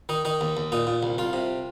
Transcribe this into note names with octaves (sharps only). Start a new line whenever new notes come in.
D#3 D#4
D#3 D#4
D#2
D#2
A#2 D#4
A#2
C2
C2 F4
C3